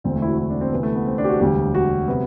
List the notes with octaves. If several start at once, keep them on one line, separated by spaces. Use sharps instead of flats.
E1 D2 D3 C4
A3
E4
F#4
E4
D4
C4
D2 C3 E3 B3
A3
B3
C4
D4
G4
F#4
E1 D2 D3 G3 G4
F#4
C3 F#3 B3